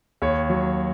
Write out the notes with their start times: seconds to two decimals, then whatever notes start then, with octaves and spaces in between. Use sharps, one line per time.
0.22 D#2 C#5
0.50 F#3